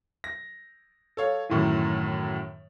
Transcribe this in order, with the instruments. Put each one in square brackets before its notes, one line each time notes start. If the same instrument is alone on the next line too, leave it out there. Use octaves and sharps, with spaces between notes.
[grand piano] A#6
A4 C#5 F5
F#2 A2 D#3 E3